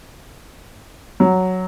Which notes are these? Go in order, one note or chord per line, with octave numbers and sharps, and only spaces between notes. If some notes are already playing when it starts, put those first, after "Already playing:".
F#3